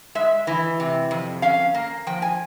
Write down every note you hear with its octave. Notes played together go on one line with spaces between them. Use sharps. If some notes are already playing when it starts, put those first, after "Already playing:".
G#3 E5
E3
C3
F2
C#4 F5
A#3
F3 G5
G#5